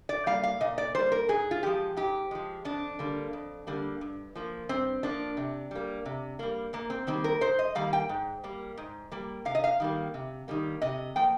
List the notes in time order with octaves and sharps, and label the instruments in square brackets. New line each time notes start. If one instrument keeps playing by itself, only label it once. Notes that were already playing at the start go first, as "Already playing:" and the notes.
[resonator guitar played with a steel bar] D5
G3 A#3 F5
F5
A#2 D#5
D5
G3 A#3 C5
A#4
G#2 G#4
F4
F3 G#3 G4
G#2 G4
F3 G#3
F2 D4
D3 G3 A#3
F2
D3 G3 A#3
G2
F3 A#3
G2 C4
F3 A#3 D4
C3
G3 A#3
C3
G3 A#3
G#2 A#3
C4
D#3 G3 A#3 C4
A#4
G#2 C5
D#5
D#3 G3 A#3 F5
G5
G#2
G3 A#3
G#2
G3 A#3
C3 F5
D#5
F5
D#3 G3 A#3
C3
D#3 G3 A#3
C3 D#5
F3 A#3 G5